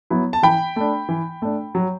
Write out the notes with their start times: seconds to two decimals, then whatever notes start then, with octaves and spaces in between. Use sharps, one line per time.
0.10 F#3 B3 E4
0.33 A5
0.43 E3 G5 B5
0.76 A3 D4
1.09 E3
1.42 A3 D4
1.75 F#3